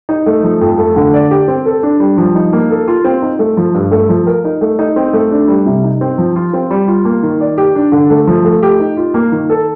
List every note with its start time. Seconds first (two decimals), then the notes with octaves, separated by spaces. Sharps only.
0.09 D#4
0.26 A3
0.43 F3
0.61 F2
0.78 A3
0.96 D3
1.14 D5
1.31 G4
1.48 C4
1.66 A4
1.83 D4
2.00 G3
2.17 F3
2.35 D#4
2.53 A#3
2.70 A4
2.88 F4
3.04 C4
3.22 D#4
3.39 A3
3.57 F3
3.74 G2
3.92 A3
4.09 F3
4.27 A#4
4.45 D#4
4.61 A3
4.79 D#4
4.96 C4
5.13 A3
5.31 D4
5.48 G3
5.66 C3
5.84 D#4
6.01 C4
6.18 F3
6.36 F4
6.53 C4
6.71 G3
6.88 F4
7.05 A#3
7.23 D#3
7.41 D5
7.58 G4
7.75 D4
7.92 D3
8.10 A3
8.27 F3
8.45 A3
8.63 G4
8.80 D#4
8.97 F4
9.14 A#3
9.32 D#3
9.49 A4